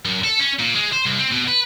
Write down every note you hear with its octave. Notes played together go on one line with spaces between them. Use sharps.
F#2
A4
C#4
A#2
G#3
C5
C2
C4
B2
B4